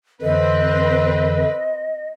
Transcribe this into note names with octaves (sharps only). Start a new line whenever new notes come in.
F2 D3 E3 C4 B4 D#5